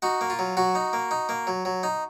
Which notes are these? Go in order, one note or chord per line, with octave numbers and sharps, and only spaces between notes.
D#4 F#4
A#3
F4
F#3
F#3 F#4
D#4
A#3
D#4
A#3
F#3
F#3
D#4